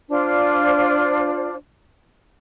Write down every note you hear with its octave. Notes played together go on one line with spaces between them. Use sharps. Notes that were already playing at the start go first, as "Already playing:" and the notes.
D4 F4 C5